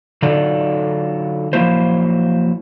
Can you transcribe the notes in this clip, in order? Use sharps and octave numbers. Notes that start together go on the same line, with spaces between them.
D3 F#3 D#4 F4 A4 D5
F3 F#3 A#3 E4 C5